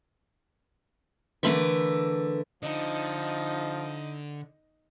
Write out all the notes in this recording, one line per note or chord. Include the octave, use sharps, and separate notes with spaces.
D3 E3 A3 C4 A#4 B4
D3 F3 D#4